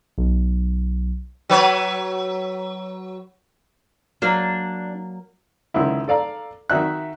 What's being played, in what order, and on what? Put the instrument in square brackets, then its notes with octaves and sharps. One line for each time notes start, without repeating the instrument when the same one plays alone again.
[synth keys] B1
[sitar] F#3 B4 C#5
[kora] F#3 A#3 [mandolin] D4
[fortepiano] C#2 D3 D#3 E4
A4 D5 F5 A#5
D#3 F#4 E5 F#6